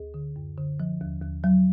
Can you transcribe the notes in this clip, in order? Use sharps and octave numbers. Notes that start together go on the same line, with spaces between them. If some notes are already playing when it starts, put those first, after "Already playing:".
Already playing: D2 G#4
D3
F#2
D3
F3
D#2
D#2
F#3